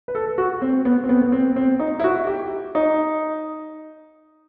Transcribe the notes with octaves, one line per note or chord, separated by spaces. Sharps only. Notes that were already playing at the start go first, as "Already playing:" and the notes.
B4
A4
F#4
C4
B3
C4
B3
B3
C4
C4
D#4
E4
F#4
G4
D#4